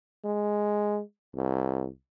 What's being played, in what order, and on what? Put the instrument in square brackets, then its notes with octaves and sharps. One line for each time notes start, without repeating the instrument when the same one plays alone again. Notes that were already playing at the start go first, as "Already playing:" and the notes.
[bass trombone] G#3
C2